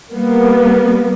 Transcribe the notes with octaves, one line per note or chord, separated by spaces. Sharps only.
G3 A#3 B3